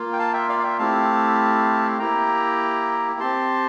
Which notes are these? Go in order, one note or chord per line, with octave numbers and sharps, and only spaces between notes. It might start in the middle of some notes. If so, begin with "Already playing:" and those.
Already playing: A#3 F4
G5
F5 A5
E5 G5
D5 F5
F5
E5 G5
A3 C4 E4 G4 F5 A5
A#3 E4 G4 G5 A#5
C4 G4 A5 C6